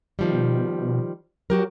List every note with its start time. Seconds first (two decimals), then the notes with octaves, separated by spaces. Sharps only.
0.19 B2 D#3 F3 G3
1.50 F#3 F#4 G4 A#4